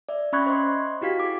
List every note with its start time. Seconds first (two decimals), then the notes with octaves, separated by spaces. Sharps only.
0.09 D5 E5
0.33 C#4 E5 B5 C#6 F#6 G#6
0.46 C5 D#5 C6
1.01 E4 F#4 G4 F5 B6
1.20 G#4 D6